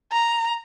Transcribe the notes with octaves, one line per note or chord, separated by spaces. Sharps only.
A#5